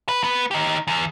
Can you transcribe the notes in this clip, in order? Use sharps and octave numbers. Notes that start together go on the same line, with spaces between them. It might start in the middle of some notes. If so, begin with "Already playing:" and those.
B4
B3
D#4 G4
E2